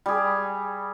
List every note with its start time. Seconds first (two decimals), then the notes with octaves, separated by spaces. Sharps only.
0.06 G3 G#4